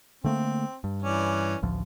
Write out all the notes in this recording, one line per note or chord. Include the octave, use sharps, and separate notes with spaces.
D3 A3 A#3 C4
G2
E3 C#4 D5
A1 D2 F3